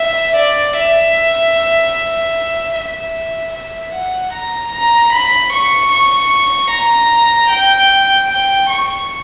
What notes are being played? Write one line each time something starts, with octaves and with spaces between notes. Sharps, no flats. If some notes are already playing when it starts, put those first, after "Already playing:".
Already playing: E5
D5
E5
E5
E5
F#5
A#5
A#5
B5
C#6
C#6
A#5
G5
G5
C#6